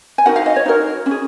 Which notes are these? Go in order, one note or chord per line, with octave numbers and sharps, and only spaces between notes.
G#5
D#4 F#4 A#4 F#5
F5
D#5
C#5
D#4 F#4 A#4
C#4
G#4